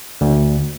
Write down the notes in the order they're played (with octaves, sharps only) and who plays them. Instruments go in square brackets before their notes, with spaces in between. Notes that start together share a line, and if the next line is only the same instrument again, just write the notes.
[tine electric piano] D2